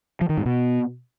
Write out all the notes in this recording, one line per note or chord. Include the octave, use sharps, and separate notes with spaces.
F3
D#3
G#2
B2